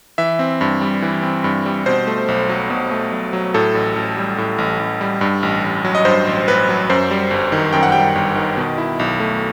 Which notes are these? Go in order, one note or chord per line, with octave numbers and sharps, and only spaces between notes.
E3 E5
C4
G2
G3
E3
C4
G2
G3
B2 C5
A3
B1
F#3
B2
A3
B1
F#3
A2 A4
A1
A1
G3
A2
A1
A1
G3
G2
A1
A1
F#3
D#5
G2 C5
A1
A1 B4
F#3
F#2 C5
G3
G1
D#3
F#2 G5
F#5
G3 G5
G1
D#3
B2
E4
B1
A3